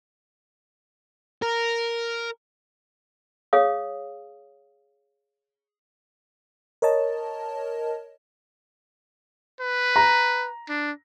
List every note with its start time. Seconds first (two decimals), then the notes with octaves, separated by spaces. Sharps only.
1.42 A#4
3.53 G#4 C#5 F5 D#6
6.82 A#4 C#5 D#5 A5
9.60 B4
9.96 A#5
10.69 D4